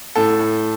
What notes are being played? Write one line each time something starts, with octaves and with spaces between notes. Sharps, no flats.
A2 A4
A2